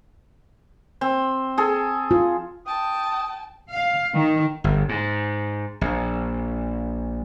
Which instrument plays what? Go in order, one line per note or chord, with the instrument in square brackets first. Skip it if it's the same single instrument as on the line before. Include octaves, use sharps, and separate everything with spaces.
[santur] C4
G#4 A4
[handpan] F4
[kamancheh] G5 A5 [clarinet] D#6
[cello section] F5
D#3
[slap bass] G1
G#2
A#1